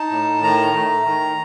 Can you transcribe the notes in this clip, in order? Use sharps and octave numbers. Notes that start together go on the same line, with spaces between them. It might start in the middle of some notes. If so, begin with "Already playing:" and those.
Already playing: D#4 A5
A2
D#3 A#5
A3
D#3